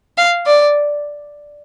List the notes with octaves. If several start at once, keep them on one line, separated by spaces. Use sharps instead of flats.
F5
D5